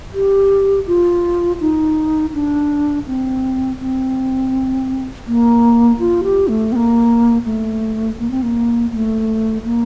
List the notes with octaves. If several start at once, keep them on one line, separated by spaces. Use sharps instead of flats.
G4
F4
D#4
D4
C4
C4
A#3
F4
G4
A3
C4
A#3
A3
A#3
C4
A#3
A#3
A3
A#3